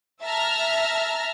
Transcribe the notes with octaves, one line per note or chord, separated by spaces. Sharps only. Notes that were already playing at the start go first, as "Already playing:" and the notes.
E5 A5 A#5 F6